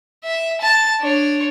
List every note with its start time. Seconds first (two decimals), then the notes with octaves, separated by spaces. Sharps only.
0.24 E5
0.61 A5
1.01 D4 C#5